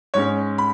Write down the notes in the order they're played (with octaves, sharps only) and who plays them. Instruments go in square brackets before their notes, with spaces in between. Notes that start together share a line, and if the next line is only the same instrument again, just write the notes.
[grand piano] G#2 G#3 C#4 C#5
B5